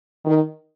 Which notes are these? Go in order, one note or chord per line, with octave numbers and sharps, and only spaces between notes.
D#3